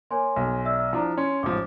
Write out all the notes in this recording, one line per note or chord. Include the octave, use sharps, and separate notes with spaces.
A#3 C#5 G#5 C6
B1
D5 E5 E6
F3 D4 E4 A#5
C#4 C6
A1 G#2 F3 D6